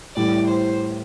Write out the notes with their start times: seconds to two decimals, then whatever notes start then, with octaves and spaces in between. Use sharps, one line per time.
0.16 A2 E3 G3 D5
0.48 C5